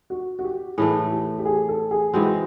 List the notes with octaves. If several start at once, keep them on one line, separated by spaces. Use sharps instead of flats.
F#4
F#4
G4
A2 E3 A3 G#4
G4
G4
G#4
A4
G#4
E3 G#3 C4 F#4